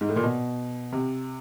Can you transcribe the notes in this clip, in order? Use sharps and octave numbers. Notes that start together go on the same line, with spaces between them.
G#2
A2
A#2
B2
C3